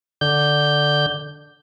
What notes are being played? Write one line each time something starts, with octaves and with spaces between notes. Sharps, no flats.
D3 G6